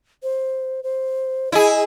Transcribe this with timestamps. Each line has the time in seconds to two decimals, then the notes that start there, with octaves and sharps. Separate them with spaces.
0.23 C5
0.83 C5
1.52 E4 G#4 D#5